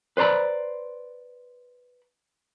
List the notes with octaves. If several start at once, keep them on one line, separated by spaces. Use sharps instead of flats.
B4 C5 D5 A#5 B5